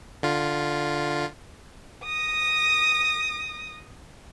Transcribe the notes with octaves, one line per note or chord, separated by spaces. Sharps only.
D3 F4
D#6 A#6